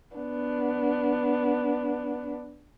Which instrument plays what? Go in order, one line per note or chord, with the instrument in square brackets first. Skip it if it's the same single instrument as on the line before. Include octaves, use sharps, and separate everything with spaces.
[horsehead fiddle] B3 D4